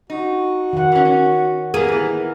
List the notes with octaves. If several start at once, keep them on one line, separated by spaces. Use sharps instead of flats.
D#4 F#4
D#3 F#5
E3 C#4
C#4
A#3 B3 G#4 A#4
E3 B3